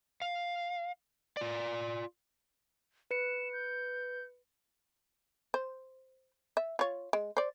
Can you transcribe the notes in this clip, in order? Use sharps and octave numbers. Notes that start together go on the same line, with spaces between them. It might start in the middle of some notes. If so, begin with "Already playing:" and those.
F5
F4 D5
B4 C#7 E7
G6
C5
E5
F4 C#5
G#3
C5 D5